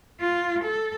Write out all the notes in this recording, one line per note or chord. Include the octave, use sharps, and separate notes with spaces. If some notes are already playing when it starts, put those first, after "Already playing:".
F4
A4